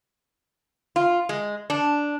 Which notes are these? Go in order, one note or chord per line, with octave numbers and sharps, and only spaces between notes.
F4
G#3
D4